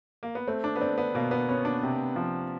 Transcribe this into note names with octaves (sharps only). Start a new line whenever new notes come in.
A#3
B3
A3 C4
D4
B3
C4 D4
B3
B2 A#3
B3
B3 C#4
D4
C3
F3